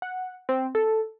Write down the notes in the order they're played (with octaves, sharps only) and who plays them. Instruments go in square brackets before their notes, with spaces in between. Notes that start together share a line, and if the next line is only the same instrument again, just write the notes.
[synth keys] F#5
C4
A4